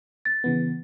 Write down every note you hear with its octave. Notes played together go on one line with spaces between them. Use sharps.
A6
C#3 E3 B3